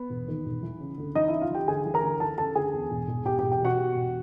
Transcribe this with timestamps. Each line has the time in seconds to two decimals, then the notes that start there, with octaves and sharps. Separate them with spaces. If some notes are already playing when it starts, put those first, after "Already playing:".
Already playing: B3
0.10 E1
0.28 D#2
0.45 E1
0.63 E3
0.80 C#3
0.98 D2
1.15 E3 D#4 D#5
1.28 C#3 E4 E5
1.41 F4 F5
1.51 E3 G4 G5
1.68 D2 G#4 G#5
1.85 E3
1.94 A#4 A#5
2.03 D2
2.20 E3 A4 A5
2.38 C#3 A4 A5
2.55 D2 G#4 G#5
2.73 E2
2.91 E1
3.08 E1
3.26 E1 G4 G5
3.39 G4 G5
3.43 E1
3.52 G4 G5
3.61 B2 F#4 F#5
3.79 B2
3.95 E1